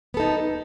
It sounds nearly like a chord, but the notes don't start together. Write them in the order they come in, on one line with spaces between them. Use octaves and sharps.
B3 A4 D#4